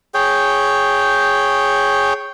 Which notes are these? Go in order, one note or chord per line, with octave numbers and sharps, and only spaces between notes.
G#4 C#5 G5